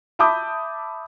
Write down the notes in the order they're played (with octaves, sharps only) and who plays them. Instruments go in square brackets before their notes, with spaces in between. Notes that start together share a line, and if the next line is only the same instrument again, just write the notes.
[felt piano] E5 A5 B5 D6 D#6 G6